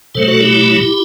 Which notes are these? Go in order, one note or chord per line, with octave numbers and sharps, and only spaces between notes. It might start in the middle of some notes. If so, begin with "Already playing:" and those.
B2 F#3 A3 A4 C5
F#4 A4
E4 G4